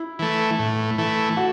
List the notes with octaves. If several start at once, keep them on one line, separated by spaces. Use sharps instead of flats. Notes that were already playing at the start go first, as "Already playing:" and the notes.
Already playing: E4
E3 A3
A2
E3 A3
F#4